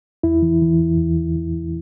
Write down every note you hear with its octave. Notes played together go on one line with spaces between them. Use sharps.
E2 E4
E3
E3
E2
E2
E3
E3
E2